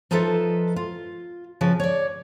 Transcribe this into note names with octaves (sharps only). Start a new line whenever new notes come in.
F3 D#4 F4 A4 B4 E5
F4
C#3 F3 B4
C#5 D5